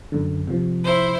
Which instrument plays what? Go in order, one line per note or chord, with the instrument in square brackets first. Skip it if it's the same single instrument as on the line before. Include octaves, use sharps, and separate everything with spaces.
[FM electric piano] F#2 D3
C3 F3
[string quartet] E4 C5